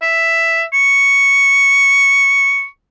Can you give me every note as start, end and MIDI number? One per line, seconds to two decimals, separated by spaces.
0.02 0.64 76
0.73 2.66 85